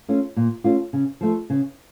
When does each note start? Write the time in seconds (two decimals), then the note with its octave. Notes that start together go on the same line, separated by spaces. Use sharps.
0.08 A3 C#4 F4
0.36 A#2
0.64 A3 C#4 F4
0.93 C#3
1.21 F3 A3
1.50 C#3